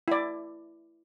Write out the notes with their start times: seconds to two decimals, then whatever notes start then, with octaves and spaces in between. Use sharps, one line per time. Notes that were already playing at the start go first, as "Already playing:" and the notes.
0.08 E4 D5